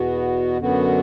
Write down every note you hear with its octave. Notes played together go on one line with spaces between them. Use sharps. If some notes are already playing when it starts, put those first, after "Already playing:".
Already playing: E2 B2 B3 F#4
F#2 D3 B3 F#4